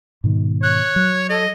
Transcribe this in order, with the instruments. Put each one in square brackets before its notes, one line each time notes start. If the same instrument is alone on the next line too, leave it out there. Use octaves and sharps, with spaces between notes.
[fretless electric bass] G#2 B2 D#3
[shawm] C#5 [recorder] F#6
[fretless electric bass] F#3
[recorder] A4 [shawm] D#5